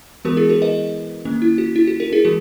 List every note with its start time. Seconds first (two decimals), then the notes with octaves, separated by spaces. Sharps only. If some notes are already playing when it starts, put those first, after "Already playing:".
0.25 E3 G#3 B3 F#4 A#4
0.37 E4 G#4
0.49 F#4 A#4
0.62 B4 D#5
1.25 D#3 A#3 C#4
1.42 E4
1.58 F#4
1.76 E4
1.87 F#4
2.00 F#4 A#4
2.13 E4 G#4
2.25 E3 G#3 F#4